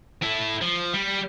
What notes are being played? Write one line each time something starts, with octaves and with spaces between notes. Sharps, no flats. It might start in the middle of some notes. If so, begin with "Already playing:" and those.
E4 A4
F3
G3